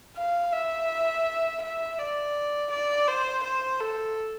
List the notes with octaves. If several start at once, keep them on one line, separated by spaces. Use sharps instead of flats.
F5
E5
E5
D5
D5
C5
C5
A4